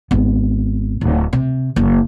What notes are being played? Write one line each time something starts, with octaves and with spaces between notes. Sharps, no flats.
G#1 B3
D1
C3
F#1